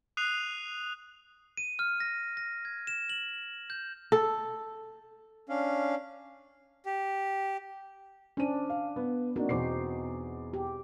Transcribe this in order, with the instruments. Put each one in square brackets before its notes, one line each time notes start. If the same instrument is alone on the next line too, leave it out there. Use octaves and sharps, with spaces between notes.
[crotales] D#6 F#6 C7 D#7 F7
[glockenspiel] D#7
F6
A#6
A#6
G#6
E7
F#7
G6
[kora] A4
[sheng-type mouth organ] C#4 D4 F5
G4
[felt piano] C#4 C5 D#7 [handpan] D4
[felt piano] F5
B3
[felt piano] A#3 D4 [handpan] C4 D#4 F#4
[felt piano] E2 D6 C7 [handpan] B2 D#4 C5
[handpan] G4